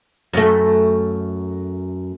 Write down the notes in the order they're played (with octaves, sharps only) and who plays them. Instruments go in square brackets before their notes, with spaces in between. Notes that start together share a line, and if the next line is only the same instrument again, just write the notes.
[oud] F#2 A3